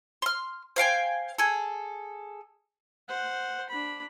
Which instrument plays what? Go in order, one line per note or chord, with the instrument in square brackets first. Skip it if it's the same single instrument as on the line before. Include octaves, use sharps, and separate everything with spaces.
[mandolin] C6 F6
C5 F5 G5 G#5
G#4 A4
[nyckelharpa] C5 F#5
D4 B5